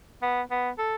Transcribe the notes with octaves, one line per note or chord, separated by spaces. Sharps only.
B3
B3
A4